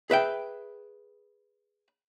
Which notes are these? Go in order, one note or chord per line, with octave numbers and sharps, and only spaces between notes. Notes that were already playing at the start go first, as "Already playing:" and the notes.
G#4 B4 E5 G5